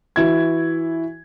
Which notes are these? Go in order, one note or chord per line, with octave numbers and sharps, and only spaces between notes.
E3 E4 F#4 G#6